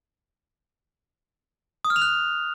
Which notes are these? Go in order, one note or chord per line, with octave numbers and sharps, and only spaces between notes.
D#6
F6
F7
F#6